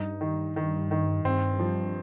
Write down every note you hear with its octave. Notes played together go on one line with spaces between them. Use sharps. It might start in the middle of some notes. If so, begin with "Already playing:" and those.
Already playing: G2 D#4
D#3
D#3
D#3
G2 C4
F3